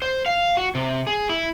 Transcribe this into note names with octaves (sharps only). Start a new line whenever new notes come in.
C5
F5
F#4
C3
G#4
E4